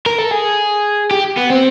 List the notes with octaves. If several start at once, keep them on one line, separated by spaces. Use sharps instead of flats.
A#4
A4
G#4
G4
B3
C4